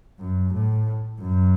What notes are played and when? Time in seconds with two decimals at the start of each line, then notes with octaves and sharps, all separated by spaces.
0.20 F#2
0.53 A2
1.22 F#2